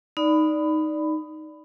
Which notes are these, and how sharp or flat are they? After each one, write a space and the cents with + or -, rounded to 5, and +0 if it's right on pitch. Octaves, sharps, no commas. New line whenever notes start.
D#4 +0 D5 +0 B5 +15